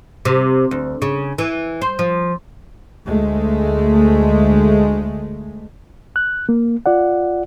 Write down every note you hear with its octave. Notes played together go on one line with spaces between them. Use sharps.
C3
D2
C#3
E3
C5
F3
D2 G#3 A3
F#6
A#3
F4 D5 F#5